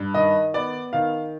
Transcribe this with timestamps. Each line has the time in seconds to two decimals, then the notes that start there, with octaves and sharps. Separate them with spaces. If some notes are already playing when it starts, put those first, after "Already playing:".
Already playing: G2
0.14 D#3 D#5
0.54 B3 D5
0.93 D#3 F5